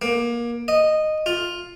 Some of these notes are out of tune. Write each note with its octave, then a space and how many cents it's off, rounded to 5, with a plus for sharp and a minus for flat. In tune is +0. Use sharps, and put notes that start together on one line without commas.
A#3 +25
D#5 -10
F4 +10